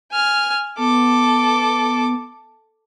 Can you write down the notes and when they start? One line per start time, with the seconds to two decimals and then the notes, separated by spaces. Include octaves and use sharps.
0.12 G#5 F6
0.78 B3 A4 D6